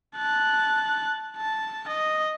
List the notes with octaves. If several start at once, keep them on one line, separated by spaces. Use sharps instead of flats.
A5 F#6
A5
D#5